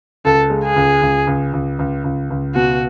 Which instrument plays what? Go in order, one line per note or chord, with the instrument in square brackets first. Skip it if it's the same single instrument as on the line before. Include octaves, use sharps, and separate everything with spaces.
[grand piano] C#2 [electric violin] A4
[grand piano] G#3
[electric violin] G#4
[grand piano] C#2
C#2
C#2
C#2
C#2
C#2
C#2
[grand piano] B2 [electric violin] F#4